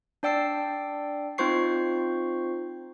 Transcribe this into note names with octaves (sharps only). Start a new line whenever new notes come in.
D4 D5 G5 E6 C7
C4 D#4 F4 C5 C#6 C7